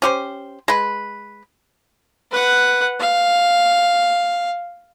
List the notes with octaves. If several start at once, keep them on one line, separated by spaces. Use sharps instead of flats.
C#4 G4 C5
G#3 B4
B4 F#5
F5